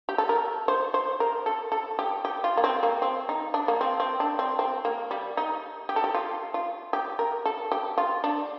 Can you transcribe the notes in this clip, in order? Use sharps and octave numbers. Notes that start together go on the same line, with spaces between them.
G4
A4
A#4
C5
C5
A#4
A4
A4
G4
G4
F4
A#3
C4
A#3
C4
D#4
D4
A#3
C4
C4
D4
C4
C4
A#3
G3
D#4
G4
A4
G4
F4
F4
G4
A#4
A4
G4
F4
D4